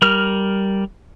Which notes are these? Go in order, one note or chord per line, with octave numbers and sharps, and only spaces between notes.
G3 A#4 F6